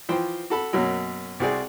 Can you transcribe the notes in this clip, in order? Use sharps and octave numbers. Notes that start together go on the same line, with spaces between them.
E3 F3 C5 G5
F#4 A4 B5
F#2 B2 F#3 A#3 C#4
C2 C4 F#4 G#4 D5